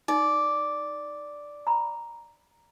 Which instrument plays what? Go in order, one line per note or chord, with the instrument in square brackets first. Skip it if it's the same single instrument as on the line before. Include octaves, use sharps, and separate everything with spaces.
[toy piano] D#4 [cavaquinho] D5
[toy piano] A#5 B5